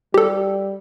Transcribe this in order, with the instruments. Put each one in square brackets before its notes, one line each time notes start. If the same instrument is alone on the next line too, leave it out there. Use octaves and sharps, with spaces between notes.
[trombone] G3 [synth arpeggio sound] G4 A4